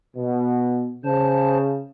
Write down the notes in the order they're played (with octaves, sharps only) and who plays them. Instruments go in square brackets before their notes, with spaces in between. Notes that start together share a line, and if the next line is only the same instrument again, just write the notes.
[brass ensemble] B2
[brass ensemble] C#3 [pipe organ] C5 A5